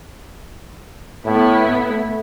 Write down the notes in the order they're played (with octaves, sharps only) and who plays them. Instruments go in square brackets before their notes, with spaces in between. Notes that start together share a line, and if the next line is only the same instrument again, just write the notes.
[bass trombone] A2 [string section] B3 E4
[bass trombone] A3